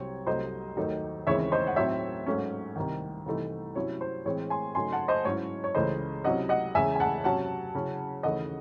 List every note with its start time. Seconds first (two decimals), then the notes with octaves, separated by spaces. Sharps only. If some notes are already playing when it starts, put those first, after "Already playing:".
Already playing: C2 C3 F#3 C4 C#5
0.27 C2 C3 F#3 A3 C5 D#5
0.77 D#2 D#3 F#3 A3 D#4
1.27 D#2 C#3 E3 G#3 C4 C#5 E5
1.52 C5 D#5
1.67 F#5
1.76 A2 F#3 C4 D#4 C#5 E5
2.26 G#2 F#3 A3 C#4
2.76 C2 C3 D#3
3.26 C2 C3 E3 A3 D#4
3.75 C3 F#3 C#4 E4 C#5
4.01 C5
4.25 A2 E3 G#3 C4 C#5
4.50 G#5 C6
4.75 C#3 F#3 A3 D#4 G#5 C6
4.92 F#5 A5
5.08 C5 D#5
5.25 G#2 F#3 C#4 E4 C#5
5.64 C#5
5.75 C#2 C#3 E3 A3 C5 D#5
6.24 C3 F#3 C#4 E4 D#5 F#5
6.49 D#5 F#5
6.75 E2 C#3 G#3 E5 G#5
6.95 G#5
7.00 F#5 A5
7.24 C3 F#3 C#4 F#5 A5
7.74 C#3 F#3 C#4 E4
8.23 D#2 C#3 E3 A3 D#5 F#5